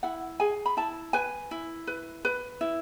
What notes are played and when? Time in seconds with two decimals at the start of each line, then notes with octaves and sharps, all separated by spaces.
0.03 E4 F#5
0.40 G#4 G#5
0.66 B5
0.77 E4 A5
1.13 B4 G#5
1.51 E4
1.87 B4
2.25 B4
2.61 E4